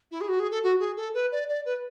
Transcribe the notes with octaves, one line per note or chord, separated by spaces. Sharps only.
E4
G#4
F#4
G#4
A4
F#4
G#4
A4
B4
D5
D5
B4